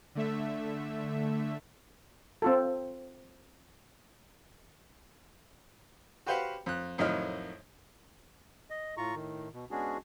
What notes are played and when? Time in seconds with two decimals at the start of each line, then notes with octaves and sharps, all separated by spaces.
0.15 D3 A3 E5
2.42 C4 F4 A4
6.26 F#4 G4 B4 C5 F5 F#5
6.66 F2 F#6
6.98 F2 A2 D#3 F#3 D#5 F6
8.70 D#5
8.97 A2 F4 A#5 C#6
9.15 A2 D#3
9.54 B2
9.71 G#3 B3 C#4 D4 F#4 G#4